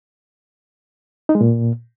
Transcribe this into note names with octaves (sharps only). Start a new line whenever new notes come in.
D#4
G#3
A#2